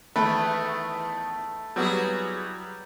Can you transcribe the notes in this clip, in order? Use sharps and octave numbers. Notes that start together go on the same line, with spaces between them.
E2 D#3 A3 B5 F#6
F#3 G3 B3 E4 F#4 G#4